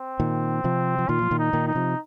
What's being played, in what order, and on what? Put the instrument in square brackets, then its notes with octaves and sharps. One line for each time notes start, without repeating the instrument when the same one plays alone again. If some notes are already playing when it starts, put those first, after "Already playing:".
Already playing: [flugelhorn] C4
[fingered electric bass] A#2 D#3
C3 F3
F3
[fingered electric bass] A#2 D#3 [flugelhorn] F4
[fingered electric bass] F3
A#2 D#3
[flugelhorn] D#4
[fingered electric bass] A#2 D#3
[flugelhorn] D#4
[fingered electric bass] C3 F3